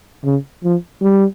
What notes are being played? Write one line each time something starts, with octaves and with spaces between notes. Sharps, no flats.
C#3
F3
G3